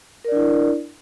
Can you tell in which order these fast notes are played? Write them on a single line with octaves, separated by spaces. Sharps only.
A#4 D5 D4 E4